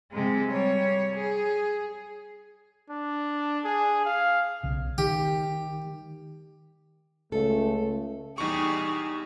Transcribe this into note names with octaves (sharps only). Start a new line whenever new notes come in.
C3 G#3
G3 C#5
G#4
D4
G#4
F5
B1 C#3
D#3 G4
C#2 A3 A4
E2 G3 D#4 G#4 C#6